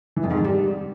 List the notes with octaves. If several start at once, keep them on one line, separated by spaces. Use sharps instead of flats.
E3
F2
G#2
D#3
G3